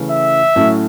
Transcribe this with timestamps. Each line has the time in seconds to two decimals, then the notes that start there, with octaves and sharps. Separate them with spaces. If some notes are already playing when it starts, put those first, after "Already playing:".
Already playing: C#3 E3 A3 C#4
0.11 E5
0.56 A2 F#3 A3 C#4 F#4